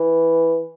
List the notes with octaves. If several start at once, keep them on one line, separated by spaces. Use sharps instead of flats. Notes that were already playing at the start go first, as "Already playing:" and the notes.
Already playing: E3